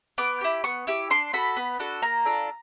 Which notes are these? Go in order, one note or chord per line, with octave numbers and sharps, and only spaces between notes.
B3 D6
E4 G4
B3 C#6
E4 G4
D4 C6
F#4 A4 B5
B3
D4 F#4 A4
A#3 A#5
D4 F4 A4